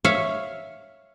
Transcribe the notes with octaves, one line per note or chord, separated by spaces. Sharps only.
C#5 E5 F5